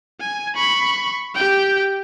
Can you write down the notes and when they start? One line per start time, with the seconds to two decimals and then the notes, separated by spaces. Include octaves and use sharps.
0.21 G#5
0.56 B5 C#6
1.35 G4 G5